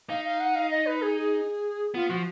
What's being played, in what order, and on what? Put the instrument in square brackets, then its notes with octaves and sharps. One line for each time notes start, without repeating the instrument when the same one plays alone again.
[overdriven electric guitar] D#4 [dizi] F5
[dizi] F5
F#5
F5
D#5
B4
G#4
G#4
[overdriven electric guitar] B3 [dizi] F4
[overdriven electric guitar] F3 [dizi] F#4